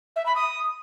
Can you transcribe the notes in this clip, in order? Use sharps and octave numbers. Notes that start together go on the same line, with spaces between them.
E5
B5
D#6